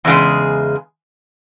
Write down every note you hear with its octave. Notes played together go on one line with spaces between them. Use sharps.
E2 C#3 G#3